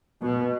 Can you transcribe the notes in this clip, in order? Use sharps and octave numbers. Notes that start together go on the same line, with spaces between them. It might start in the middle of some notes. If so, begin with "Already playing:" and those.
B2